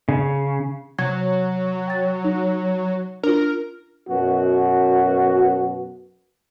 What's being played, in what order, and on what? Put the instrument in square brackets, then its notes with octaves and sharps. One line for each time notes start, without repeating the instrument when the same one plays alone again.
[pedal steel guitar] C#3
[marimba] C3 G#6 [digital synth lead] F#3
[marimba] G5 A6
D#4
[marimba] D4 F4 [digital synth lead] A#4
[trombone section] F#2 B2 F#4